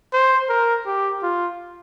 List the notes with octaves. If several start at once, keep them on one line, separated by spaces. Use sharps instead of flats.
C5
A#4
G4
F4